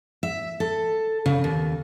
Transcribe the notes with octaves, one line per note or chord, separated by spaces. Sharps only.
E5
A4
C#3
D#2